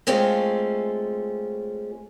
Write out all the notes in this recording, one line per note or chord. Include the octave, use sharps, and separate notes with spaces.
G#3 A3 C4 C#4 F4